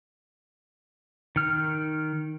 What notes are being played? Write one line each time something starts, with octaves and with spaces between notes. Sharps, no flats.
D#3 F6